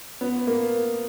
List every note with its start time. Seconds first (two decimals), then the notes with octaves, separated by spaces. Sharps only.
0.21 B3
0.47 A#3